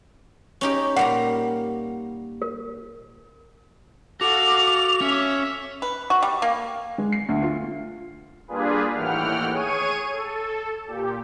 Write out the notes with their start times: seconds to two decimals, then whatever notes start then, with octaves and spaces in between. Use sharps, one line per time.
0.61 C#4 D#4 G4
0.96 A#2 G3 F#5 G5 A#5
2.42 A#4
4.21 F#4 A4 F5 F#5 D6 F7
5.01 C#4 E5
5.82 B4
6.10 F#4
6.23 G3
6.42 A#3
6.98 G#3
7.12 C7
7.29 D2
7.42 F4
8.48 G3 A#3 D4 F4 G#4 B4
8.93 D#2 A2 E3 F#5 G5 F6
9.51 G#4 C#5 C#6 D#7
10.12 A4
10.87 A#2 G4